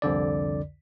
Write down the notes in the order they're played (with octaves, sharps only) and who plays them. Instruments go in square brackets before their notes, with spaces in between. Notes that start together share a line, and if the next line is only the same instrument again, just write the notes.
[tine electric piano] C2 F2 D3 D5